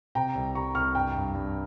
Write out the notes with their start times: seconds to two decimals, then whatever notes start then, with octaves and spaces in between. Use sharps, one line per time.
0.15 C3 G5 A#5
0.35 C2
0.55 G3 A#5 C#6
0.75 C2 C#6 F6
0.95 G2 G5 A#5
1.15 G2
1.35 G2